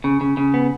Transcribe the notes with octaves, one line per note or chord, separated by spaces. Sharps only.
C#3
C#3
C#3
B3